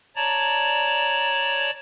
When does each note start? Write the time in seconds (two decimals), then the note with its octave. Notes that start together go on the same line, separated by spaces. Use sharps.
0.16 C#5 D5 A5 A#5